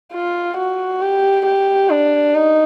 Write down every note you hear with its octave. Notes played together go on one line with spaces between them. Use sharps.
F4
F#4
G4
G4
D4
D#4